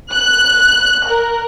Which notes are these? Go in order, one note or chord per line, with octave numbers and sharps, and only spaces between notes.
F#6
A#4